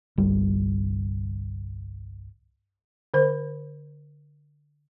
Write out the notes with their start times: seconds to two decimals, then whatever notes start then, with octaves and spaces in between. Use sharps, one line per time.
0.18 G1 C2 G3
3.14 D3 C5